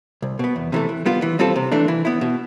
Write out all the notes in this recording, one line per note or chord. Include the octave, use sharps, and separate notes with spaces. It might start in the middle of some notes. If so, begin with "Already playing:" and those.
C2
B2 B3
E2
C3 E3 A3
E3
G3 B3 F4
E3
G3 C4 F4 A4
C3
E3 A3 D4
E3
B3 E4
B2